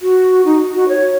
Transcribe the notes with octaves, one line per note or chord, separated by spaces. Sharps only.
F#4
D#4
F#4
C#5